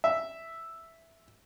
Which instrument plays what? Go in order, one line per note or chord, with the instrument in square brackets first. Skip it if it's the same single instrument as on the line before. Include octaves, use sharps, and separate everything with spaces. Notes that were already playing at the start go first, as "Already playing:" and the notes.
[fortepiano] E5